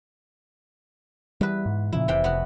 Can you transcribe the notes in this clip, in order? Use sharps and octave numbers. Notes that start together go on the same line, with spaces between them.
E2 G3 B4
G#2
A#2 C#3 F3 E4
F1 C3 E3 G5
F1 B3 F#4